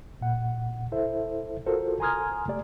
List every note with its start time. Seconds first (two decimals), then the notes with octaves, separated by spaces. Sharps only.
0.21 A#2 F#5
0.92 E4 A4 C5 E5
1.66 F4 F#4 A4 A#4 C5
2.00 G#5 A#5 C6 D#6 F6 G#6
2.48 A3 G4 D5